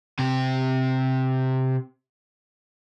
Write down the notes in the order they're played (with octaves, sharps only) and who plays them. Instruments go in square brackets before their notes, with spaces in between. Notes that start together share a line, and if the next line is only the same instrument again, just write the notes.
[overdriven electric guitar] C3 G4